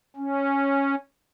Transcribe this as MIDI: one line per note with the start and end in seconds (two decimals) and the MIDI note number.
0.16 0.95 61